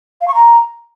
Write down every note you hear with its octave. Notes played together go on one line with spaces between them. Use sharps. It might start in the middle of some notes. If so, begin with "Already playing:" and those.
F5
C#6
A#5